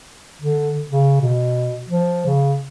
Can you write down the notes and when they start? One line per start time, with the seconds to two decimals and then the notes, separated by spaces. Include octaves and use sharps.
0.42 D3
0.91 C#3
1.21 B2
1.90 F3
2.26 C#3